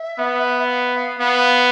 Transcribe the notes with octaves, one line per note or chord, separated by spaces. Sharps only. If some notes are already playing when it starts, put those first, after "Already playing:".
Already playing: E5
B3
F5
F5
B3 F5